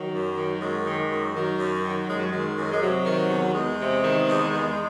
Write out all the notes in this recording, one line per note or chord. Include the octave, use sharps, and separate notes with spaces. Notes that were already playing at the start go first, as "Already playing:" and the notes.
Already playing: D#3 F#3
F#2
D#3
F#2 G#3
D#3
G#3
F#2
D#3 F#3
F#2
D#3
F#2 G#3
F#3
D#3 G#3
F#2
G#3
C3 F#3
D#3
E2
E2 G#3
C3
D#3
E2
E2